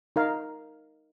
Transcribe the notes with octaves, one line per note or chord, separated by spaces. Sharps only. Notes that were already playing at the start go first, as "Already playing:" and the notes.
D#4 A#4 F5